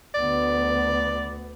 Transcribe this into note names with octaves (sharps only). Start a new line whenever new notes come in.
D2 B3 D5